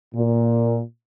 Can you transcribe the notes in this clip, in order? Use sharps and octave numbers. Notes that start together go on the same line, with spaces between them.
A#2